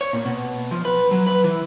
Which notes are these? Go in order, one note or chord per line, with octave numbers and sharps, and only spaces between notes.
C#5
A#2
B2
F3
B4
F#3
B4
E3